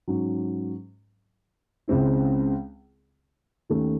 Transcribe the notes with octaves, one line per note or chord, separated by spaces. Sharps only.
G#2 F#3 C#4
C#2 C#3 G#3 C4 E4
D#2 D#3 A3 C#4